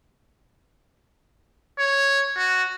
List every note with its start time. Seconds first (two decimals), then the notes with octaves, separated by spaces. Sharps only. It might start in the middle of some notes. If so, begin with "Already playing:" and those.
1.79 C#5
2.36 F#4